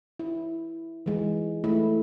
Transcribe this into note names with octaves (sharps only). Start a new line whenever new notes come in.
E4
E3 G#3
A3 E4